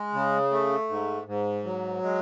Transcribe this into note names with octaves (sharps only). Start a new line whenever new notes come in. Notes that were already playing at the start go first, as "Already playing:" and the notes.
Already playing: G#3
C#3
A3
G#2
G#2
F#3
G#3